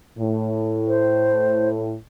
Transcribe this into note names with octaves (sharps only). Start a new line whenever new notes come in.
A2
C5